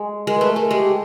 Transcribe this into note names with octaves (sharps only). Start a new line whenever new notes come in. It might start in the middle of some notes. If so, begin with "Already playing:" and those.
Already playing: G#3
G#3 A#4
A3 B4
A#4
A3
G#3 G4